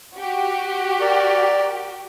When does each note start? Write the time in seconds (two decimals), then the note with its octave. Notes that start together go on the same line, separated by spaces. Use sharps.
0.15 F#4 G4
1.01 A#4 D5